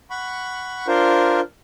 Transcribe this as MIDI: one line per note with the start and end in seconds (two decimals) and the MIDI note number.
0.10 0.87 78
0.10 0.87 83
0.10 0.87 85
0.87 1.40 62
0.87 1.40 65
0.87 1.40 70
0.87 1.40 72